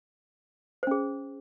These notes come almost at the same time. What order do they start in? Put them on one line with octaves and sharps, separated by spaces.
C5 C#4 G#4